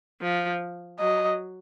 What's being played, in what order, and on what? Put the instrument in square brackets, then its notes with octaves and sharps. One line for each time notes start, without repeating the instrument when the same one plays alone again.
[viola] F3
[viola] F#3 [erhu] D#5